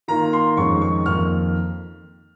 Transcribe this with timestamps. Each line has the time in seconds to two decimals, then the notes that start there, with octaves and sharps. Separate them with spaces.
0.08 D#3 A#3 F4 A#5
0.33 C6
0.57 F2 D#3 G#3 C#4 C#6
0.81 C#6
1.06 F2 D#3 A#3 F6